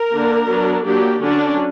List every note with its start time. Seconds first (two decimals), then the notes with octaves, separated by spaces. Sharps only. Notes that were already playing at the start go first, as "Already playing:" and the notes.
Already playing: A#4
0.13 D3 A#3 D4
0.48 F#3 B3 D4
0.85 F#3 A#3 D4 G4
1.21 D3 F#3 C#4 D4